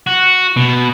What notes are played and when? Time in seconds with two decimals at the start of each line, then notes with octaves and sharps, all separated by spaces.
0.07 F#4
0.57 B2